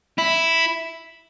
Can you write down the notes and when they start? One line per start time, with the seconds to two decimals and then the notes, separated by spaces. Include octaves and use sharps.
0.19 E4